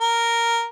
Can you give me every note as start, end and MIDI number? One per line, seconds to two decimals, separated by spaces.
0.01 0.66 70